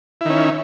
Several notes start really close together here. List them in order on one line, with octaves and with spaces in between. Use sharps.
E4 D#3 C#4